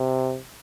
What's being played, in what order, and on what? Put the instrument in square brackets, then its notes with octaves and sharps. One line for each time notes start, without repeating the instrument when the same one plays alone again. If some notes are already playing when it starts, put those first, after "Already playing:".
Already playing: [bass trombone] C3